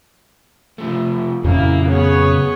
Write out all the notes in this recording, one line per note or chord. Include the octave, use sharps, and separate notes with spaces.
C3 F3 A3
F2 A#2 C#3 F#3 A#3 E4
B3 G#4 C#5